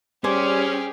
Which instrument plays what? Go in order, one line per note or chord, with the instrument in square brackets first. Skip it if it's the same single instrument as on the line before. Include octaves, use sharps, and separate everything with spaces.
[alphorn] G3 [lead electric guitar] C#4 [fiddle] G4 G#4 [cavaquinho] C5 G#5 D6